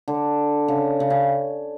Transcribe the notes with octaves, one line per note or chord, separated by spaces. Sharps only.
D3
C#3
C#3
C#3